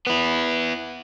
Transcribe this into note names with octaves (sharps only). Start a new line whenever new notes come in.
B3 E4